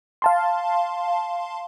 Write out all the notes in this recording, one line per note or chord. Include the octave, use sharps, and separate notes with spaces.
F5 A5 C6